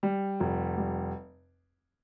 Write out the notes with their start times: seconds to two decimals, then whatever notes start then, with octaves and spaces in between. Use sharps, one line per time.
0.03 G3
0.40 F1
0.78 G3